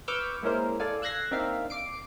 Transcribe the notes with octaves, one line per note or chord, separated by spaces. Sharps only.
B4 C#6 D6 E6 F6 G6
G#3 A#3 C#4 E4 A#4 C5
A4 D5 F5 G#5
E6 F#6 G#6 A#6 C7
A#3 C4 D4 D#4 E5 F5
D6 C7 D7